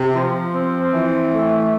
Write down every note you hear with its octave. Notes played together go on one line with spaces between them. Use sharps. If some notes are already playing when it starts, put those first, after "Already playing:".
Already playing: C3
F3
C4
E3
A3